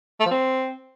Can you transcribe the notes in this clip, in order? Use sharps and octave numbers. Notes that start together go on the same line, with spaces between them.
A3
F3
C4